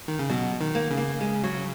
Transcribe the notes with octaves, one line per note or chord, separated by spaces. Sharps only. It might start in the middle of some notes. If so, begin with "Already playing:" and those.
D#3
C#3
B2 F#3
D#3
A#3
C#3
A#3
G#3
F#3